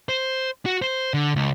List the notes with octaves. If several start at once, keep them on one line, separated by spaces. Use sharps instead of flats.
C5
F#4
C5
D3
C#2